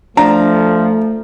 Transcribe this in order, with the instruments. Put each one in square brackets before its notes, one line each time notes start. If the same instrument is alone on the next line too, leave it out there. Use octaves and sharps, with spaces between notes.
[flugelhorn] F3 [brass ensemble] A3 [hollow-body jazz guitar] D4 [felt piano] A#5